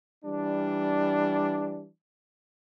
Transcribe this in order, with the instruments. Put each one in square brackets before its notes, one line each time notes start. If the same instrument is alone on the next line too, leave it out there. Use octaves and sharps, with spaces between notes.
[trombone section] E3 G3 D4